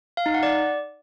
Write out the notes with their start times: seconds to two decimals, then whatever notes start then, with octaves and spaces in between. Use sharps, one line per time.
0.17 F5
0.26 D#4
0.34 F#5
0.43 D5